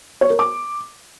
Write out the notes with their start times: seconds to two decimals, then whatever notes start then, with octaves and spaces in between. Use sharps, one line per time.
0.21 C#5
0.30 A#4
0.39 D6